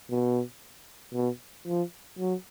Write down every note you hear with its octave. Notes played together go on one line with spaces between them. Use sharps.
B2
B2
F3
F#3